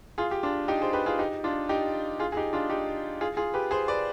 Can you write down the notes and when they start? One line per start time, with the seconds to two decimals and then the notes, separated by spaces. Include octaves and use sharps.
0.18 F4 G#4
0.31 G4
0.43 D4 F4
0.68 D#4 G4
0.81 G#4 C5
0.93 G4 B4
1.06 F4 G#4
1.19 D#4 G4
1.44 D4 F4
1.69 D#4 G4
2.19 F4 G#4
2.32 G#4
2.37 D#4 G4
2.53 D4 F4
2.70 D#4 G4
3.21 F4 G#4
3.37 F4 G#4
3.54 G4 B4
3.71 G#4 C5
3.88 B4 D5